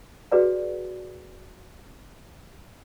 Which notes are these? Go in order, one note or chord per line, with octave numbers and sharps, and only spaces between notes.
F#4 G#4 B4 D5 F#5